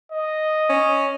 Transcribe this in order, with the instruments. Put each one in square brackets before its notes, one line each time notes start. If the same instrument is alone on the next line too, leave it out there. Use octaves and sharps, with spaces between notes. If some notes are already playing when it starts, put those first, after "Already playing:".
[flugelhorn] D#5
[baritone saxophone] C#4